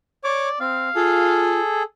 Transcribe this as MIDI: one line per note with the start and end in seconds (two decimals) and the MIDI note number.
0.24 0.49 73
0.24 0.56 74
0.24 0.49 86
0.60 0.89 60
0.60 1.48 77
0.95 1.60 65
0.95 1.83 68
0.95 1.83 69